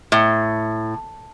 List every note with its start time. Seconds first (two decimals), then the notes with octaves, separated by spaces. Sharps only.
0.12 A2